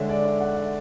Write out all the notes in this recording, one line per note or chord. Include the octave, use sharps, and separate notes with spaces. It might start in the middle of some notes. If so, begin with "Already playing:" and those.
Already playing: D3 G#3 C#5 E5
D5
E5
F#5
E5